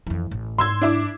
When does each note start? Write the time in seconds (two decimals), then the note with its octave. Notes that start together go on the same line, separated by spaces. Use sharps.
0.07 F2 E3
0.31 A1
0.58 G#2 C6 E6 G#6
0.81 D4 E4 D6